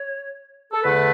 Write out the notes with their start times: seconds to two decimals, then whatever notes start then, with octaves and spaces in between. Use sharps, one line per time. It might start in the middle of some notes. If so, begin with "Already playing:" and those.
Already playing: C#5
0.72 A4
0.84 E2 D3 A3 B4